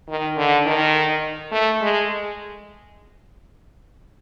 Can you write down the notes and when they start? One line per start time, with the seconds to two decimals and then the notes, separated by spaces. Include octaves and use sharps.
0.09 D#3
0.37 D3
0.65 D#3
1.52 A3
1.81 G#3